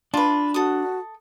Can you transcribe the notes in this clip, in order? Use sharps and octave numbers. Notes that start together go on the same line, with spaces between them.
D4 F4 B4
F#4 A4 D#6